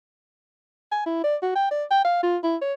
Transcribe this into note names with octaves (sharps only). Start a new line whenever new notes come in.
G#5
E4
D5
F#4
G5
D5
G5
F5
F4
E4
C#5